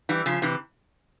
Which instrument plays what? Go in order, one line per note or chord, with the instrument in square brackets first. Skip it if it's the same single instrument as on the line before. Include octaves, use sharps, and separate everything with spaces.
[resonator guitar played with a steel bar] E3 G3
C#3 F3
C3 E3